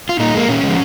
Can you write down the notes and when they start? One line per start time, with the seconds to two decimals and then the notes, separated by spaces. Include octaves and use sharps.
0.09 F4
0.20 A#2 D#4
0.34 G#3 A#3
0.48 A#2 C#4
0.64 F3 G#3